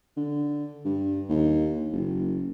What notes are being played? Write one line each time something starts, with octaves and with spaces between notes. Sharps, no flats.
D3
G2
D#2
F#1